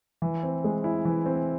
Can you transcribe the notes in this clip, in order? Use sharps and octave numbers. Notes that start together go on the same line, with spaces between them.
E3
C4
G#3
E4
E3
C4